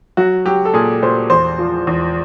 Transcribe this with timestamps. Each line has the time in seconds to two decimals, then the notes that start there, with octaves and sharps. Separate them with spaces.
0.17 F#3 F#4
0.46 F#3 G4
0.65 A4
0.74 A#2 G#4
1.02 A#2 C5
1.30 E2 C5
1.59 F3
1.87 E2